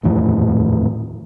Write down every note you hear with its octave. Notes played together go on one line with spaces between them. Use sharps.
D#1 F2 A2 E3